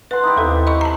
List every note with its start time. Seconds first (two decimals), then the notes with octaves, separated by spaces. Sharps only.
0.11 B4 F#5 C6
0.23 D#4 E4 G4
0.37 D#2 C3 A4 F5
0.67 D#5 B5 C#6
0.81 A5 A#5